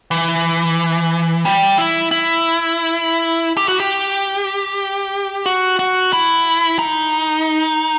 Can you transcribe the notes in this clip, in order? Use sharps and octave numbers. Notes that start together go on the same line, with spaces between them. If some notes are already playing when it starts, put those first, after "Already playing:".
E3
G3
E4
E4
G4
F#4
G4
F#4
F#4
E4
D#4